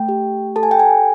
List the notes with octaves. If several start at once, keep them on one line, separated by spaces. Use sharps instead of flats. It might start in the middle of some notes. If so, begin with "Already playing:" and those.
Already playing: A3 G5
G4
A4 A5
G#5
G5
G#5